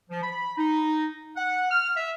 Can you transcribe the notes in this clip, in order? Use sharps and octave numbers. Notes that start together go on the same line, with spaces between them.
F3
B5
D#4
F#5
F6
E5